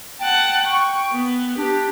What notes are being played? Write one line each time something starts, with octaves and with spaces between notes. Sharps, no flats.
F#5 G5 A5
C#6
B3
D4 G4